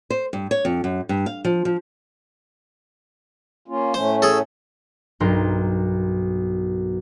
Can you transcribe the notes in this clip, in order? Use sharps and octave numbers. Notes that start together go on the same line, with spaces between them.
C5
G2
C#5
F2
F#2
G2
F5
F3
F3
A#3 C#4 F4
A2 A3 C#4 C5
G#4 A4
B1 G2 A#4 C6